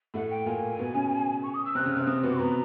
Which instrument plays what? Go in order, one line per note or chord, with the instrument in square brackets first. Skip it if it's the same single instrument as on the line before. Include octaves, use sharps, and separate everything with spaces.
[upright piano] A2 A3 [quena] F#5
[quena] G5
[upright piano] A#2 A#3 [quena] G#5
[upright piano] B2 B3
C#3 C#4
[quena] C#6
D#6
E6
[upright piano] C3 C4 [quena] F#6
[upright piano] C#3 C#4
[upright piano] C3 C4 [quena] F6
[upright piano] C3 C4 [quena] D#6
[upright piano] B2 B3
[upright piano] B2 B3 [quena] A#5